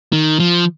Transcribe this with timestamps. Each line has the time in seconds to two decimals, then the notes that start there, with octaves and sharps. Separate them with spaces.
0.13 D#3
0.40 F3